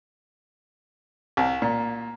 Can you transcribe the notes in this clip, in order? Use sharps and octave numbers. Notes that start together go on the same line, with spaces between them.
C2
A#2